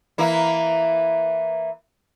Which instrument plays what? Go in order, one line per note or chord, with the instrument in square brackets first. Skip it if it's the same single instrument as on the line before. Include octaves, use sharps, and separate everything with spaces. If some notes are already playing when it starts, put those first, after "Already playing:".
[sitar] E3 A#3 E4